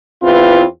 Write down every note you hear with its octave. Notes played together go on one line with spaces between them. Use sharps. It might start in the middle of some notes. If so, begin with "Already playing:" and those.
E2 C4 E4 F4 B4